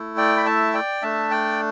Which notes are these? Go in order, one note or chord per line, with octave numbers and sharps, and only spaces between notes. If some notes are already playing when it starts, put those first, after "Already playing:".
Already playing: A3 E4
D5 G5
B5
E5 A5
D5 G5
A3 D4 E5 A5
D5 G5